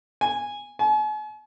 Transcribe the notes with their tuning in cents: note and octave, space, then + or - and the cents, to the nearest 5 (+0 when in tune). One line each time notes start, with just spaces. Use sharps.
G#5 -10
G#5 +45